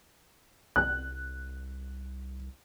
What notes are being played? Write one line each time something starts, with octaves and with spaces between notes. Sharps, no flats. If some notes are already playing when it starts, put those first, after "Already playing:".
C2 F#6